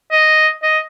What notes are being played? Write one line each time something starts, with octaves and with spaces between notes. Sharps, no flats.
D#5
D#5